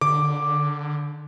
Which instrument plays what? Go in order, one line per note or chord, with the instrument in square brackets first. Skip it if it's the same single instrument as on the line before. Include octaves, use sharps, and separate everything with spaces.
[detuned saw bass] D3 [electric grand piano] D6